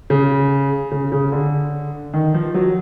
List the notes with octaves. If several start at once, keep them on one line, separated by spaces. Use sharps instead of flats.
C#3
C#3
C#3
D3
D#3
F3
F#3